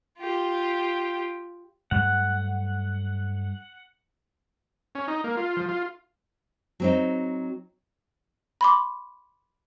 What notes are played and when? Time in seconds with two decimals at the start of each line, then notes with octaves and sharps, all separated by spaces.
0.19 F4 G4
1.91 G2 F#3 A3 F#5
4.95 C#4
5.08 D#4
5.24 A#3
5.37 F4
5.57 F3
5.68 F4
6.80 F#3 C4 D#4
8.61 B5 C6 D6